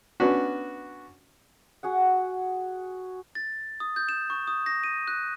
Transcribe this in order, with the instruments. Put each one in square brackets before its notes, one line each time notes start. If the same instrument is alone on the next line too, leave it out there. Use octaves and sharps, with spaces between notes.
[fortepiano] B3 C#4 D4 F#4
[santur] F#4 G#4 F#5
[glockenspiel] A6
D#6
G6
E7
C#6
D#6
A#6
D#7
F#6